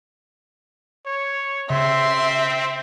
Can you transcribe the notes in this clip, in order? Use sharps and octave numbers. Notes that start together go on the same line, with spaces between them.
C#5
C#3 C4 E5 C6